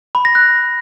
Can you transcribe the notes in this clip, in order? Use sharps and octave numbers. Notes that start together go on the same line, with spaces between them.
B5
A#6
F#6